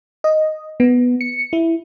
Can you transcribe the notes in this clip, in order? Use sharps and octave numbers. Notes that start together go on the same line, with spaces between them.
D#5
B3
C#7
E4